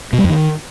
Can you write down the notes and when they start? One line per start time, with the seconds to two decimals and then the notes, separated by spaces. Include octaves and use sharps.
0.13 B2
0.18 G3
0.24 F2
0.30 D#3